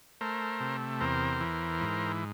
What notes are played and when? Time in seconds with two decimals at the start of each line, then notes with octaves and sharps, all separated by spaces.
0.21 A3 A#4 C5
0.60 C3
1.01 E2 A#4 C5
1.41 E3
1.81 G#2